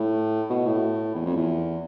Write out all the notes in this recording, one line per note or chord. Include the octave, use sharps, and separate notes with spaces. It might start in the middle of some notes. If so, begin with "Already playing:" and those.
Already playing: A2
B2
A2
E2
F2
E2